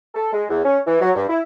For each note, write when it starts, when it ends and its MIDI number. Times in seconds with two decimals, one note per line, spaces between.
0.15 0.31 69
0.33 0.44 56
0.50 0.64 40
0.65 0.78 61
0.86 0.98 52
1.01 1.10 54
1.16 1.24 43
1.30 1.41 64